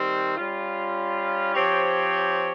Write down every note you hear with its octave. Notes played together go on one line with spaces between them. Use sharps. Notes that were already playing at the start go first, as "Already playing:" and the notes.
Already playing: D#3 G3 C4
G3 C#4 F4
F3 C4 G4 C#5